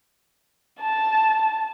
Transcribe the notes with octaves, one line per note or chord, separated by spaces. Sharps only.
A5